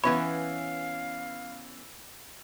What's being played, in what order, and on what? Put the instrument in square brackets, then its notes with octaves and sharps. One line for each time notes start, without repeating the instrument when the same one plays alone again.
[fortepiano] E3 E4 [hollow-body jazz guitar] B3 C#4 C#5 [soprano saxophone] F5 [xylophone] B5